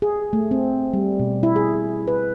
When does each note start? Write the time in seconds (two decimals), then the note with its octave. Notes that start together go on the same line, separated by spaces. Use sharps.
0.02 G#4
0.33 A3
0.51 C4
0.93 G3
1.19 B2
1.43 E4
1.56 G#4
2.08 B4